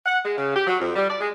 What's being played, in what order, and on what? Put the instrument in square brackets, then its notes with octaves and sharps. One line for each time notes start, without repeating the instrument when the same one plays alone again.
[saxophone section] F#5
G#3
C#3
G4
F#3
F2
G3
D5
G#3